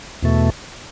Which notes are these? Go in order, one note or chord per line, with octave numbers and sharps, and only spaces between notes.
E2 B2 A3